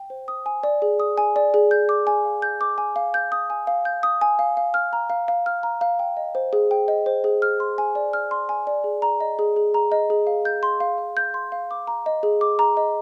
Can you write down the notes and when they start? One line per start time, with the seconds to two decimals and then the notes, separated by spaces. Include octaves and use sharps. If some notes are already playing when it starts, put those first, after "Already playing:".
Already playing: G5
0.10 C5
0.28 D#6
0.46 G#5
0.63 D5
0.82 G#4
1.00 D#6
1.18 G#5
1.36 D5
1.54 G#4
1.71 G6
1.89 D6
2.07 G#5
2.25 F5
2.42 G6
2.61 D6
2.78 G#5
2.96 F5
3.14 G6
3.32 D#6
3.50 G#5
3.67 F5
3.85 G6
4.03 D#6
4.21 G#5
4.39 F5
4.57 F5
4.74 F6
4.93 A#5
5.10 F5
5.28 F5
5.46 F6
5.63 A#5
5.81 F5
5.99 G5
6.17 D#5
6.35 C5
6.53 G#4
6.71 G5
6.88 D#5
7.06 C5
7.24 G#4
7.42 F6
7.60 C6
7.78 G#5
7.95 D5
8.13 F6
8.31 C6
8.49 G#5
8.67 D5
8.84 G#4
9.02 A#5
9.21 D#5
9.39 G#4
9.56 G#4
9.74 A#5
9.92 D#5
10.10 G#4
10.27 F5
10.45 G6
10.63 C6
10.80 F5
10.98 F5
11.17 G6
11.34 C6
11.52 F5
11.71 D6
11.87 A#5
12.06 D#5
12.23 G#4
12.41 D6
12.59 A#5
12.77 D#5